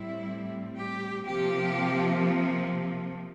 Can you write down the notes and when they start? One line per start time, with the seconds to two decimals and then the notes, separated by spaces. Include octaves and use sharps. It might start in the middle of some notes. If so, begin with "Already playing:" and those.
Already playing: A2 G3 C4 E4
0.78 G4
1.26 C3 F3 A#3 G4